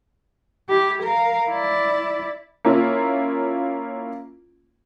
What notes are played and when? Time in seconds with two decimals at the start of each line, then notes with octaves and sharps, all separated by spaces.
0.69 E4 G4
1.02 A#4 F5
1.50 E4 D5
2.65 A#3 C#4 E4 F4